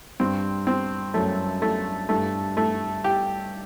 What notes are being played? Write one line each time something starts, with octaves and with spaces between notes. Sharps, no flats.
G2 C4
C4
F#2 A3
A3
G2 A3
A3
G4